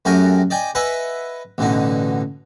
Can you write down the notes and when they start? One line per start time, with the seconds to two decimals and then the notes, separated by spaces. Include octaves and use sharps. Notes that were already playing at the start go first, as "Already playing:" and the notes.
0.05 F#2 A3 F#4 G4 A#4 G#5
0.50 D5 D#5 G5 G#5
0.75 B4 D#5 E5 F#5 G#5
1.58 A1 B2 D3 D#4